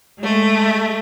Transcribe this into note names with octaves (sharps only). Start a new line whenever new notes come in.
G#3 A3